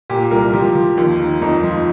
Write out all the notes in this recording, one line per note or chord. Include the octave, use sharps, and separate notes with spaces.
A#2 G4
C2 A#4
F3 G4
F3
D#2
D#3
F2 D#4
F3